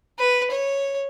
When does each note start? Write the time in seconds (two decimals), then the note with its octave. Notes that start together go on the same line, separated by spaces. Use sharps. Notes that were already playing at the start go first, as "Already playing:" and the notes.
0.19 B4
0.51 C#5